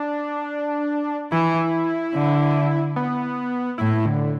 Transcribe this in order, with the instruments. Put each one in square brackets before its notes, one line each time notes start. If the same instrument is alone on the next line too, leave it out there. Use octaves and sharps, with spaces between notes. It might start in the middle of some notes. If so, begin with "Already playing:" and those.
Already playing: [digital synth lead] D4
[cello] E3 [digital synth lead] E4
[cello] D3
[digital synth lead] B3
[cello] A2 [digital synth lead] E4
[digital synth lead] D3